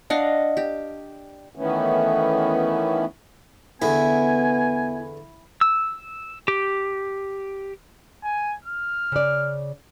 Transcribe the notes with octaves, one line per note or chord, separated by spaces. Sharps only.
D4 D#5 F5 F#5
G4
D#3 E3 A3 B3 C#4
E2 D3 B3 E4 G#5
E6
G4
G#5
F6
C#3 D5